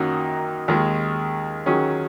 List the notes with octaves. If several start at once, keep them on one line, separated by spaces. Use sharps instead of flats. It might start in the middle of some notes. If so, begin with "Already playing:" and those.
Already playing: F#2 D#3 F#3 A#3 D#4
D#2 D#3 G#3
D#3 F#3 C#4 G#4